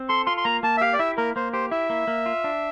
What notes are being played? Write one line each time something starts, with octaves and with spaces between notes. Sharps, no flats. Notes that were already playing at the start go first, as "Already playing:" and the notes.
Already playing: C4
A4 C6
F4 C6
C6
A#3 A#5
A#3 A5
E5
G4 F5
D5
E4 E5
A#3 A#4
A#3 C5
G4 C5
E4 E5
A#3
A#3
F4
D4